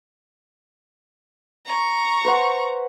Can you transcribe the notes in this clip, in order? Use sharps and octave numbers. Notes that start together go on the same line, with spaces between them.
A#5 C#6
B4 C5 F#5